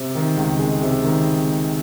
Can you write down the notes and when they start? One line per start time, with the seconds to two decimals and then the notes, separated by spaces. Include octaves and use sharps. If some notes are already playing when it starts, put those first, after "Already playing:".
Already playing: C3
0.15 D#3
0.37 C#2
0.59 G#3
0.82 C3
1.04 D#3